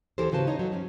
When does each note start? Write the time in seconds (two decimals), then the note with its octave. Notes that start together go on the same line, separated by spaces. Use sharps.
0.18 D#2 E3 G4 A4 A#4 C5
0.32 G#2 C#3 F#4 B4 C5 A5
0.47 D#4 C#5 D#5
0.59 F#3
0.72 G2 G3 C#4